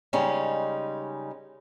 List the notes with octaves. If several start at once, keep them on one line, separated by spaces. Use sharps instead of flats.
C#3 G3 G#3 C#4 D#4